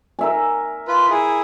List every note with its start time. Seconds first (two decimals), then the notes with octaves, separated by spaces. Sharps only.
0.19 A#4 E5 G#5
0.88 F4 B4
1.10 E4 G#4